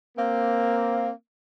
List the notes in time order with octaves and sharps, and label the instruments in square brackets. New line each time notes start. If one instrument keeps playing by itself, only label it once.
[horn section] A#3 C4